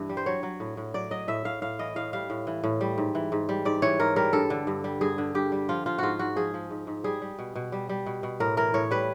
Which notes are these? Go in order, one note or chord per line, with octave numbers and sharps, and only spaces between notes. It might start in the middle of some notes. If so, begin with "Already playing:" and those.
Already playing: G2 E3
G3
C5
F#3 C#5
F#3
A2
A2
F#3 D5
F#3 D#5
A2 E5
A2 F5
A2 F5
E3 D#5
A2 F5
G3 F5
A2
E3
A2
G3
G#2
E3
G#2
G3
G#2 D5
E3 C#5
G#2 A#4
G3 A#4
G2 A4
D3
G2
G3
G2 G#4
D3
G2 G4
G3
F3 F4
F3 F4
G#2 F4 F#4
G#2 F#4
F3 G#4
F3
G#2
G#2
G3 G#4
G3
B2
B2
G3
G3
B2
B2
A2 A#4
E3 A#4
A2 C#5
G3 B4